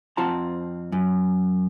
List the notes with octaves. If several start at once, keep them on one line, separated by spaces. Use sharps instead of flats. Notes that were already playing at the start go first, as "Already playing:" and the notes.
F2 C4 F4 F#5 A5 A#5
F#2